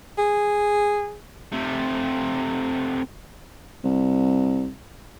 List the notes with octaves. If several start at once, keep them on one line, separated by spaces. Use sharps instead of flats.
G#4
C3 A3
C2